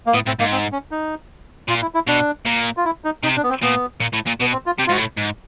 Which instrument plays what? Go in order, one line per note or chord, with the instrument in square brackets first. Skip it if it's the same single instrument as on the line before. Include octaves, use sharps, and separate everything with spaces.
[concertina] A#3
[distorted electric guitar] A2 [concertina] B3
[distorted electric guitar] A2 [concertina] C4
[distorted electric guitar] G#2 [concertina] A#3
[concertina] C4
C#4
D#4
[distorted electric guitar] A#2 [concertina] F4
[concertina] E4
E4
[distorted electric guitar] B2 [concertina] D4
[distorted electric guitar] A#2
[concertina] F4
E4
D#4
[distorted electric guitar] C3 [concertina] D#4
[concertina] D4
B3
C4
[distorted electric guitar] A#2 [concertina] B3
[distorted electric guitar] A#2
A2
A#2
[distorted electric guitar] B2 [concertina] B3
[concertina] C4
F4
[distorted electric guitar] C3 [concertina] G4
[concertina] F4
[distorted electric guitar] G#2 [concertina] F#4
[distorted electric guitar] A2
G#2